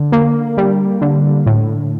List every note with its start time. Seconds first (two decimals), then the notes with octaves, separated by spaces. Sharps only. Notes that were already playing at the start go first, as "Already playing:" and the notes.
Already playing: D3
0.12 A#3
0.57 G3
1.01 D3
1.46 A2